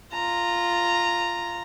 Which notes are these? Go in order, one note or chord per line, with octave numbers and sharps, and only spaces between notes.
F4 A#5